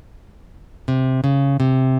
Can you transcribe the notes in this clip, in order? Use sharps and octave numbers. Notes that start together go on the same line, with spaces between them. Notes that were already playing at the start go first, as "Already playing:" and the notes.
C3
C#3
C3